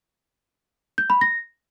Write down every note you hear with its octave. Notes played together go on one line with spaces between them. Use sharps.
G6
B5
A#6